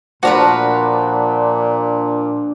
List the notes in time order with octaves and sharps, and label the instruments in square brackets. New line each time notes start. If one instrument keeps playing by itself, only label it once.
[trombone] A#2 [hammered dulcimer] F3 D4 A5 [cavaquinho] F#4 A#4 B4